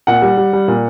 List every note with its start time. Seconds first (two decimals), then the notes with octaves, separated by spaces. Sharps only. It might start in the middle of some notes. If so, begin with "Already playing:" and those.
0.07 A#2 F#5
0.22 G3
0.37 G3
0.53 G3
0.68 A#2